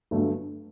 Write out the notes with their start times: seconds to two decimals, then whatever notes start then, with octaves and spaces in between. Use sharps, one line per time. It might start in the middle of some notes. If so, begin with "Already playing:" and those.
0.11 G1 G2 F#3 A3